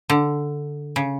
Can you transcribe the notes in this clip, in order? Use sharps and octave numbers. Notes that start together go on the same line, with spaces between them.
D3
C#3